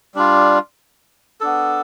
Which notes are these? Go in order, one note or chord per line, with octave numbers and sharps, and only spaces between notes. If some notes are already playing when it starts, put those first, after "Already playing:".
G3 D4 F4
B3 D4 A4